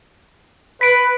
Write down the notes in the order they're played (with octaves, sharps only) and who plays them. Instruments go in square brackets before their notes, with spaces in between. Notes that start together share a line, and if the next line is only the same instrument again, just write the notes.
[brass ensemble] B4 [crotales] B6 D7